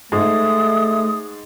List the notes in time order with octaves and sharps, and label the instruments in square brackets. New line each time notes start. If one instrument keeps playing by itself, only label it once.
[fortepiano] G#2 [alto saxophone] A3 [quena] D#6